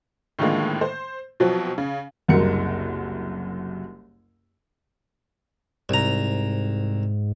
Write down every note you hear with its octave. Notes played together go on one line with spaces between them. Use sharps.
A2 D3 D#3 F3 G#3 A#3
C5
B2 F3 F#3 C4
C#3
F#1 C2 F#2 F#4 A#4 C#7
C2 G#2 A#5